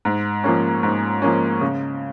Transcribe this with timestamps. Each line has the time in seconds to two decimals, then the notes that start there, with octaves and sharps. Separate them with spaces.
0.05 G#2
0.44 F3 A#3 C#4
0.83 G#2
1.22 F3 A#3 C#4
1.61 C#3